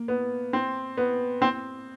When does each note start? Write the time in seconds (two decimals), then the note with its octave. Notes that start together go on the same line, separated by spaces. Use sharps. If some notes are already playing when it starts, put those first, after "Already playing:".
Already playing: A#3
0.08 B3
0.53 C4
0.97 B3
1.42 C4